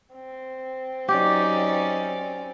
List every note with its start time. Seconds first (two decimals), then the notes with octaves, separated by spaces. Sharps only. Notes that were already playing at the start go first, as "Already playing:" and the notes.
0.14 C4
1.09 F#3 C#4 D#4 G4 D5